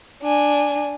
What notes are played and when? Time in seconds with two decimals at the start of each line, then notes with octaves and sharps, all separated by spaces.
0.22 D4 G#5